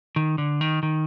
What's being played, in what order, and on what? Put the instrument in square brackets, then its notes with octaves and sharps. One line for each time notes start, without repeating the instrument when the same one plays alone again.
[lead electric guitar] D#3
D3
D#3
D#3